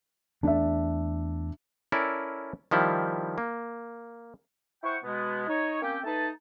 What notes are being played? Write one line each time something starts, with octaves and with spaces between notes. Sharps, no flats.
E2 A3 D4 E5
C#4 E4 A4 A#4 D5
D#3 F3 G3 E4
A#3
E4 C5 F#5 G5 C#6
B2 G#3 B3
D#4 C#5
A#3 C4 C#4 G4 G5
A3 D#4 B4 A5